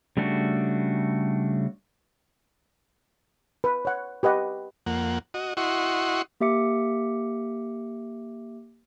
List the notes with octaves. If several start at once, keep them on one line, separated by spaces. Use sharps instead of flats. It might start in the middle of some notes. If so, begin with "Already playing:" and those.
C#3 G3 A3 D4 F#4
B4
C#5 F#5
G4 B4 D#5 F#5 D6
F2 A#3 F#5
F#4 D#5
E4 F#4 D#5 F#5 C6 C#6
A#3 G4 E5 D6 C#7